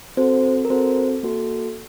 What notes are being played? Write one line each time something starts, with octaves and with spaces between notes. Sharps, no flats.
C4 F#4 A4 C5
A#4
C4 F#4 A4 C5
A#3 F#4 A4